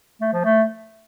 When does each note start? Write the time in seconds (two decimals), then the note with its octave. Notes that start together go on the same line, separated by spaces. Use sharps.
0.21 A3
0.33 F3
0.45 A3